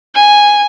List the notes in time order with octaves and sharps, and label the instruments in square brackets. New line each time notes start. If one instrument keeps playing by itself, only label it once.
[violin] G#5